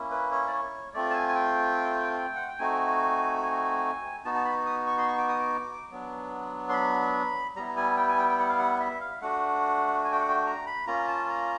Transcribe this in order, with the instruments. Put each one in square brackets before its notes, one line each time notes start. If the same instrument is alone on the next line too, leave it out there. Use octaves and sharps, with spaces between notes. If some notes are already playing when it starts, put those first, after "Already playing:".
Already playing: [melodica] A#3 C#4 E4
B4
C#5
D5
C#5
A3 C4 F4 D5
A5
G#5
G#5
G5
G5
F#5
G5
A3 C4 D#4 F#4 G#5
G#5
B3 D#4 F#4 A5
A5
B5
D#6
C#6
C6
C#6
D6
D#6
D6
F#3 B3 D4
C6
B5
G3 B3 E4 A#5
G#5
G5
G#5
G5
G5
F#5
F5
F#5
E5
F5
A3 D4 F#4 F#5
G#5
G5
F#5
G5
A#5
B5
A#3 C#4 F4 A#5
A5
A#5